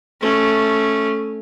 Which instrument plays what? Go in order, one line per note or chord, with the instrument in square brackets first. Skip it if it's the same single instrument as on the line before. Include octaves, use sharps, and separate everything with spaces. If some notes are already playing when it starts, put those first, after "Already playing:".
[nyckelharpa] A3 C#4